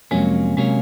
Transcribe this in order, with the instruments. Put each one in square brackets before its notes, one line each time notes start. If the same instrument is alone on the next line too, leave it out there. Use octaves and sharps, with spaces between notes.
[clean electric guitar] F2 C3 F#3 A#3 C#4 [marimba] G#3
[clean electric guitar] C3 F#3 A#3 C#4 [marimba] G#3